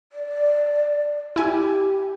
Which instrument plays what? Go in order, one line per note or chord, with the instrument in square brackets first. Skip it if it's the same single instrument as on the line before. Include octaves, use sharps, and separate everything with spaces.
[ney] D5
[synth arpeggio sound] E4 G#5 [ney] G4